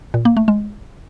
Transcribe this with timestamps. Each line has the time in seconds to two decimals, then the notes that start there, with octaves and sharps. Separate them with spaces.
0.14 A#2
0.25 A#3
0.37 A3
0.48 G#3